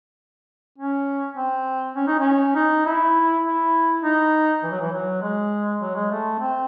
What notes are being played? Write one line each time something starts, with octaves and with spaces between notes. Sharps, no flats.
C#4
C4
C#4
D#4
C#4
D#4
E4
E4
D#4
E3
F#3
E3
F#3
G#3
F#3
G#3
A3
C4